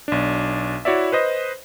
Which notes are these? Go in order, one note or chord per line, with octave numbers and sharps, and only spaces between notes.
B1 D4
E4 F#4 C#5 D5 E5
B4 C5 D#5